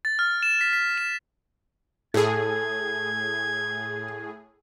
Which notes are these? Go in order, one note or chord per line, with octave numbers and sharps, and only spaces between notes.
A6
F6
E7
B6
B6
E7
A2 G#4 A4 G#6